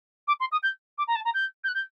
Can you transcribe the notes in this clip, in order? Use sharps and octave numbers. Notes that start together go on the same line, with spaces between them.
D6
C6
D#6
G6
D6
A#5
A5
A#5
G6
G6
F#6
G6